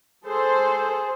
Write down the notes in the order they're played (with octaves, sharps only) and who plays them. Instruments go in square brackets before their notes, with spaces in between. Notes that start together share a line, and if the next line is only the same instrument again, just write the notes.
[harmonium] G#4 [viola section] A4 C5